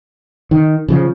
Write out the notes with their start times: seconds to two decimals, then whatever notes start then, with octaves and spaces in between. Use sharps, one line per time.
0.51 D#3
0.88 C#3 E3 F3